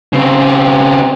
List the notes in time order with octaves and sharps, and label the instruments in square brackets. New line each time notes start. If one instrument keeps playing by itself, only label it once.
[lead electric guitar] C#3 C4